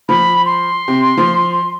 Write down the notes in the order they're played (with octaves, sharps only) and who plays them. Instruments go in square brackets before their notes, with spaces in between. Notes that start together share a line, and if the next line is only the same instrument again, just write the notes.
[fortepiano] F3 [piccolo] B5
[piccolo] C6
[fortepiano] C3
F3